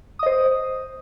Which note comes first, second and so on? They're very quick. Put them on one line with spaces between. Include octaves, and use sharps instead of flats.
D#6 D#5 C5